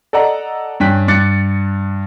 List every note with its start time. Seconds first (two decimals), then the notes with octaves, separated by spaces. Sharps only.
0.13 A4 D5 D#5 F#5 A#5
0.80 G2 C#4 G5 F#6 B6
1.08 G2 D6 F#6 A6 C#7